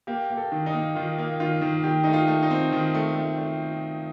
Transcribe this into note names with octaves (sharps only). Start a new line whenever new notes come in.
A#3 G4
A#3
A4
D#3
D#4
A#3
D#3 F4
A#3
D#3 F4
D#3
D#3 G4
A3 D#4
F4
A3
D#4
C4
D#3
A3
A3
A3